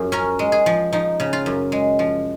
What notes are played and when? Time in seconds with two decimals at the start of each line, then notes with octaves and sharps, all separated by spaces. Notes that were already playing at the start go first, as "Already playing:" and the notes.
Already playing: F#2 F3 G#4
0.12 C#4 A#4
0.39 G#3
0.52 G#4
0.66 F3
0.92 F3 D#4
1.20 C#3
1.33 F4
1.46 F#2
1.72 G#3
1.99 F3